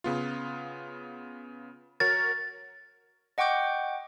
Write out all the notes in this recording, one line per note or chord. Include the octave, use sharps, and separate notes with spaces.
C#3 B3 F4
F#4 A#4 C#5 A6
D#5 F#5 G5 C#6 D6 G6